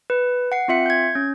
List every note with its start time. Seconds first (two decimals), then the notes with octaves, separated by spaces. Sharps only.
0.10 B4
0.52 F#5 C7
0.68 C4 F4 E5 C#7
0.86 G6 G#6
1.15 C#4